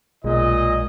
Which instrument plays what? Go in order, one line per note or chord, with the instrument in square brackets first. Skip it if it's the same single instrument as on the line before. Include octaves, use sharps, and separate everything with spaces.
[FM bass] B1 [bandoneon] A#2 [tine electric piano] G#3 [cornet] D#5